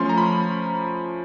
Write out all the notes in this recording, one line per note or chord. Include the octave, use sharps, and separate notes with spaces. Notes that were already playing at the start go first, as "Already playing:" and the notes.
Already playing: F3 A3 C#4 C6
A#5
B5